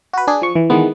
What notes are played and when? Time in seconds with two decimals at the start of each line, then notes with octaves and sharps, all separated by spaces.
0.13 F#4 B4
0.27 D4 G#4
0.42 F3 C#6
0.55 E3
0.70 D#3 E3 G#3 B3